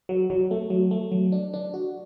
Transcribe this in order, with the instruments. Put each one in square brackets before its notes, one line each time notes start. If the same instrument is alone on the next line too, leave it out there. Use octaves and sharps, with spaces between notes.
[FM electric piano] F#3
F#3
A3
F#3
A3
F#3
D4
D4
F#4